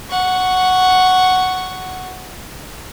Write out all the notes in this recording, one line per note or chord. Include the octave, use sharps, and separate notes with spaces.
F#5 C#6